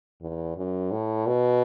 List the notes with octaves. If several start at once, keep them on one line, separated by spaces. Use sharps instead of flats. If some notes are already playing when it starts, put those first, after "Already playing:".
E2
F#2
A2
B2